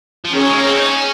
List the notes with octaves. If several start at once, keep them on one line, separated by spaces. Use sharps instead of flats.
F3
D#3 C#4 G#4 C#5
F#3
G#3
A#3
C4
D#4
C#4